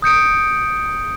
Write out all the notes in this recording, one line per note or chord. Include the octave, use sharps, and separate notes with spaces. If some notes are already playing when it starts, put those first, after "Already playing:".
D#6 G6 C#7 D7